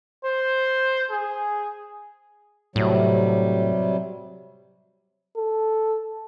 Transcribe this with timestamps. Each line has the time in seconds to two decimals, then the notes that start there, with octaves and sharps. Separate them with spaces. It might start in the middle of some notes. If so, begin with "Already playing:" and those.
0.25 C5
1.10 G#4
2.76 A2 C3 F#3 G3
5.37 A4